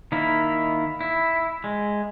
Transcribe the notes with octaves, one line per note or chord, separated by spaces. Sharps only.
D#3 A#3 E4
E4
G#3